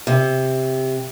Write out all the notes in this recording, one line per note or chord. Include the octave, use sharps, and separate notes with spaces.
C3